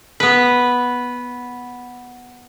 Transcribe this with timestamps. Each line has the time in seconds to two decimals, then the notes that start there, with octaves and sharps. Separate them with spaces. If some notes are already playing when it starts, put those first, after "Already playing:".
0.20 B3 B4